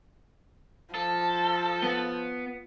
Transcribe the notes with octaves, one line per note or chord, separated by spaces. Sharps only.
F3 A4
B3